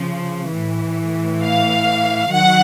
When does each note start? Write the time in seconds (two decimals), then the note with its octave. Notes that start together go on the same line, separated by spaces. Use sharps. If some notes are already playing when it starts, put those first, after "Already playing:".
Already playing: C#3 F3
0.53 A2 E3
1.43 F5
2.32 D#3 F#3 F#5